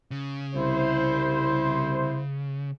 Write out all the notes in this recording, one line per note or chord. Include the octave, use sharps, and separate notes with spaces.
C#3
C2 E4 C5